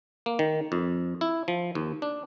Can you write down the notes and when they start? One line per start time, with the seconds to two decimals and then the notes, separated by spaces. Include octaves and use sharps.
0.26 A#3
0.39 D#3
0.72 F2
1.21 E4
1.48 F3
1.75 D#2
2.02 D4